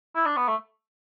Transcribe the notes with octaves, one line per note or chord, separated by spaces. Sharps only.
E4
D4
B3
A3